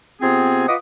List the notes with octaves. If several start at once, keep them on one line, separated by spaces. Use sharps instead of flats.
C3 B3 C4 F4 G#4
F4 B4 D#5 F#5 D6 D#6